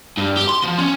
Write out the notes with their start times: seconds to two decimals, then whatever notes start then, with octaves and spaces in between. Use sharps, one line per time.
0.17 G2
0.37 G4
0.49 C6
0.64 F3
0.78 C#4